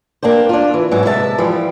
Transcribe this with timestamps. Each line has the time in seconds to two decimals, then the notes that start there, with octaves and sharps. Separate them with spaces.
0.23 A#3 D4 G4 C5
0.49 D4 F4
0.74 E3
0.91 G#2 E3 F#3
1.05 C3 G#3 E5 A5
1.38 E3 F3 G3